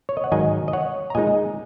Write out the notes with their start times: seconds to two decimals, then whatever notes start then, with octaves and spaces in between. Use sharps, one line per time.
0.09 C#5
0.17 D#5
0.24 F#5
0.32 G#2 D#3 F#3 D#4 D#5 G#5
0.68 D#5
0.73 C#5 F#5
1.10 A#5
1.15 A#2 G#3 D#4 D#5 G#5